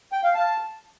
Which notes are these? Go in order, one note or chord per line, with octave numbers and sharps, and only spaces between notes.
G5
F5
A5